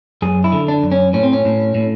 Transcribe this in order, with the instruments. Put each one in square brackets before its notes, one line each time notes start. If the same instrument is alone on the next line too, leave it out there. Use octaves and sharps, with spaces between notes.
[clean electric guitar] F#2 G#4
E4
D3
D4
F#2
C#4
A2 C#4
C4
C#4
A2
A2